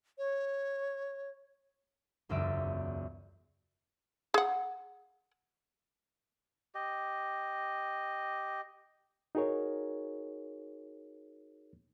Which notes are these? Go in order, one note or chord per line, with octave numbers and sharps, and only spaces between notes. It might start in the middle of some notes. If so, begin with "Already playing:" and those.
C#5
E1 C#2 F#2 D5 E5 D7
G#4 F#5
G4 D#5
D#4 F#4 G#4 A#4 C#5